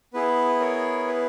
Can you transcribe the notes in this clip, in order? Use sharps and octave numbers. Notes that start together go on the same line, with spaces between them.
B3 E4 G#4 B4
A#4 C#5
B4